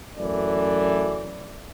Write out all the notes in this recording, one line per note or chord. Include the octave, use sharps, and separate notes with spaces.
F#2 E3 A3 D5